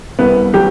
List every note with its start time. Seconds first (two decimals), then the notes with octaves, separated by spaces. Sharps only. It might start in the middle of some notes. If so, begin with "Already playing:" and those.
0.19 C2 B3
0.54 F#3 G4